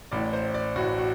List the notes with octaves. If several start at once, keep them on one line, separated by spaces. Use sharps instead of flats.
A1 A2 D5
C5
D5
A1 A2 F#4
F#4